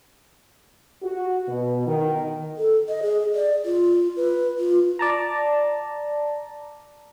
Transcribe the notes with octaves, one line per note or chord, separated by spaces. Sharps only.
F#4
B2
D#3
A4
D#5
G#4
D5
F4
B4
F4
D5 A5 A#5